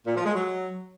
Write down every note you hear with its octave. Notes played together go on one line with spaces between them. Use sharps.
A#2
F3
G#3
F#3